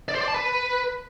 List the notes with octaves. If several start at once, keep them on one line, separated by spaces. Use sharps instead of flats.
D5
C5
D5
A5
B4